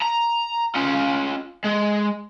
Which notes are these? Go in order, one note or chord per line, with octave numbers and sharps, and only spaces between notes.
A#5
C#4 F4
G#3